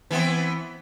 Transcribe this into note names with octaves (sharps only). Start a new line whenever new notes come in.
E3 B3 C4